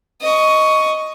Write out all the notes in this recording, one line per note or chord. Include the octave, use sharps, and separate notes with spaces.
D#5 C#6